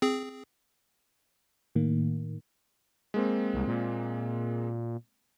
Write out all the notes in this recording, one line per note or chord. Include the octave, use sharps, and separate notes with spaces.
C4 G#4
A2 D#3 A#3
G#3 A#3 C4
C2
A#2